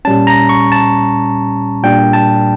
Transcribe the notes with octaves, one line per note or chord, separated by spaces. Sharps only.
A#2 G3 C#4 A5
A#5
C#6
A5
A#2 G3 D4 G5
A5